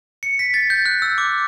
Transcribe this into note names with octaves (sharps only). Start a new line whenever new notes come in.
C#7
B6
A6
G6
F#6
E6
D6